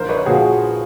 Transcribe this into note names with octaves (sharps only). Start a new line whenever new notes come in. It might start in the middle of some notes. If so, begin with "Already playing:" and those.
Already playing: A#1 A#4 C5
B4 C#5
A#2 F3 F#4 G#4